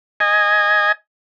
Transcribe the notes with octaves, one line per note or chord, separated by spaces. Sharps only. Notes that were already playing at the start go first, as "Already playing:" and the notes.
D#5 G#5